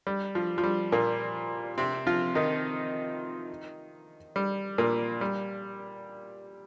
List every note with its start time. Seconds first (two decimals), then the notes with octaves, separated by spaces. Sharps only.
0.07 G3
0.35 F3
0.58 F3
0.64 G3
0.92 A#2 A#3
1.78 C3 C4
2.07 F3 F4
2.35 D#3 D#4
4.36 G3
4.78 A#2 A#3
5.21 G3